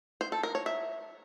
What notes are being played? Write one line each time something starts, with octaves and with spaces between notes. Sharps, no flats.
C5
A4
A#4
C#5
E5